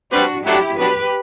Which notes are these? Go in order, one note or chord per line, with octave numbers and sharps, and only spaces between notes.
G3 C4 D4 F#4 G4 B4
F#3 A3 D4 E4 G4
B2 F#3 B3 D4 G4 B4